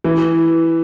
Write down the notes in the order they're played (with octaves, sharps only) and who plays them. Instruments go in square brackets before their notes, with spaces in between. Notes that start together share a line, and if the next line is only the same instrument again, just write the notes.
[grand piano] E3